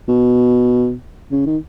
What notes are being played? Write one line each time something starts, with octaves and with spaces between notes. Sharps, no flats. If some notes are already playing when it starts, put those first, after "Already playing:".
B2
C#3
D#3